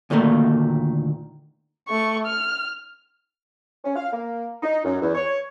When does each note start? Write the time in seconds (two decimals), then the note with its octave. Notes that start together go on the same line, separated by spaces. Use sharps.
0.10 D2 A#2 D#3 A3 A#3
1.89 A3 C#6
2.26 F6
3.85 C#4
3.96 F5
4.13 A#3
4.63 D#4
4.85 F#2
5.01 E2
5.15 C#5